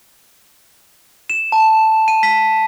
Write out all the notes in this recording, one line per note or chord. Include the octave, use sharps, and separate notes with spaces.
E7
A5
D#7
B6